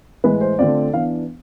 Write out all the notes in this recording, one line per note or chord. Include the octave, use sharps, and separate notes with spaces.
A2 E3 G#3 B4
C5
D3 A3 C4 F4 D5
E3 B3 D4 F5